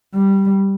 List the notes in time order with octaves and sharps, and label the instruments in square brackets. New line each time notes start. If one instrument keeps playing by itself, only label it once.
[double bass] G3